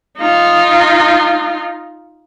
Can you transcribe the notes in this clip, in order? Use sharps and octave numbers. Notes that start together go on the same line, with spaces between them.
D#4 F4